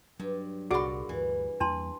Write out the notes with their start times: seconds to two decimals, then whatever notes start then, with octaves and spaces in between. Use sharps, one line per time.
0.19 G2 F#3
0.71 C2 A#2 F#4 G#4 D5 B5 C6 D6
1.09 D2 G2 E3
1.60 E2 G3 A#3 D4 A5 C6